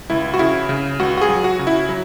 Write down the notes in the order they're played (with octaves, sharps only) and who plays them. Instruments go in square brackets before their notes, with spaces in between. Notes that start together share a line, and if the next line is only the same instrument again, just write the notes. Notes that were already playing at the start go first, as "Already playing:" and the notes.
[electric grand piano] C#2 E4
F#4
C#3 E4
C#3
C#2 F#4
F#4
G#4
F#3
F#4
C#3
E4
F#3